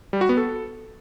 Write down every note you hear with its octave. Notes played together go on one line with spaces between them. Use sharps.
G3
F#4
B3
A4